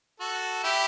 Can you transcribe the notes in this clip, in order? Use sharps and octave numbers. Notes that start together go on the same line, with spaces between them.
F#4 A4
E4 G4